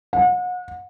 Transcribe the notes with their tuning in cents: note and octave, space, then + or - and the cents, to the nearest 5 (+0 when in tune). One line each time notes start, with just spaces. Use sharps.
F#5 -35